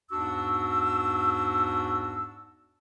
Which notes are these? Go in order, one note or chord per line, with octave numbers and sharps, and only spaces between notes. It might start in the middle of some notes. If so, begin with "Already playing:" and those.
E2 G#2 D4 F#4 E6